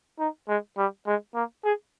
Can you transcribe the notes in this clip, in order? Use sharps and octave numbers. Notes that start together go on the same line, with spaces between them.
D#4
G#3
G3
G#3
A#3
G#4